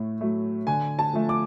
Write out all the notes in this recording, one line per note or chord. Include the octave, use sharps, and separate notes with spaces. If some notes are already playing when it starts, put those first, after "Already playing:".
Already playing: A2 A3
F#3 A3
D3 G#5
A5
F3 A3
D6